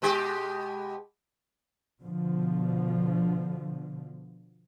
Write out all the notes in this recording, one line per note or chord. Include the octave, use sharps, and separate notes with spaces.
B2 G#3 G4
B2 D3 F3